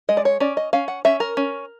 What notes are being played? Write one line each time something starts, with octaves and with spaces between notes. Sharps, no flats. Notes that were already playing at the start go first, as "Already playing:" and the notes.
G#3 D#5
D5
C#5
C#4 D5
D#5
C#4 F5
F#5
C#4 E5
A#4
C#4